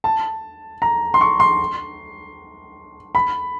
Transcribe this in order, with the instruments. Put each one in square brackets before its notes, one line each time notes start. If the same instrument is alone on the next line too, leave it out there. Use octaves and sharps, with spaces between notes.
[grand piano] A5
A#5
C6
C#6
C6
B5